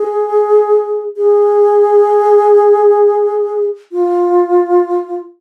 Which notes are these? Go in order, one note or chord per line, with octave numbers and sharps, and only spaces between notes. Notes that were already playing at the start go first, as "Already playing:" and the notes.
Already playing: G#4
G#4
F4